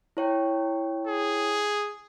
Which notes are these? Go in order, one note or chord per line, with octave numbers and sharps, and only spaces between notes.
E4 C#5 G5
G#4